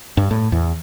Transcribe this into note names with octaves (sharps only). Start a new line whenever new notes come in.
G2
A2
E2